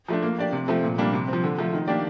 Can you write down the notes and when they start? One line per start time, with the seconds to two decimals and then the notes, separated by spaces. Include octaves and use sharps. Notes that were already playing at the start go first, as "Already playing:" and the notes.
0.08 F3 A3 D4
0.22 A#3
0.39 D4 G4 D5
0.52 C3
0.68 F3 A3 C4
0.84 A#2
0.98 G3 A#3 D4
1.13 C3
1.28 F3 C4
1.44 D3
1.59 F3 A3
1.74 D#3
1.88 A#3 D4 G4 D5